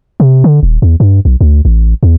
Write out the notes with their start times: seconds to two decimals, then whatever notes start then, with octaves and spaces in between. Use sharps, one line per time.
0.20 C3
0.44 D3
0.63 D#1
0.82 E2
1.00 G2
1.25 B1
1.41 D2
1.65 A1
2.03 E2